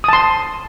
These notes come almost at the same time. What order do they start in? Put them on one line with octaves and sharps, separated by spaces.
D#6 A5 C6